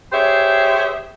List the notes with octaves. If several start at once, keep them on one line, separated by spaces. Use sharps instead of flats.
G4 G#4 C5 C#5 E5